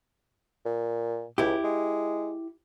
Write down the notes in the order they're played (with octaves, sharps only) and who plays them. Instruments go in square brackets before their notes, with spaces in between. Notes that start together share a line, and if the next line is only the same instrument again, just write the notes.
[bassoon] A#2
[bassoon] C#2 [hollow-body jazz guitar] E4 G4
[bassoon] G#3